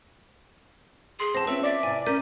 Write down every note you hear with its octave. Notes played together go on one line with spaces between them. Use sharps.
G#4 C6
E2 C4 A5 A#6
C4 C#4 F4 B4 E5
D5 E5
C3 E4 G#5
C#4 A#4 G6 B6 D#7